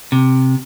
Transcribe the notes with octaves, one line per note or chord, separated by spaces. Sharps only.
C3